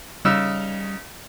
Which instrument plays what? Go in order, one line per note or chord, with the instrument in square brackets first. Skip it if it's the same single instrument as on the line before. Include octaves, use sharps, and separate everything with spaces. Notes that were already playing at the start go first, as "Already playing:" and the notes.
[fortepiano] C#3 D#4 E6 [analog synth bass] G3